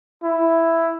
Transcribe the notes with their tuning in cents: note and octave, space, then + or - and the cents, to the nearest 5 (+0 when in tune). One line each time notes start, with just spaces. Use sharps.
E4 +5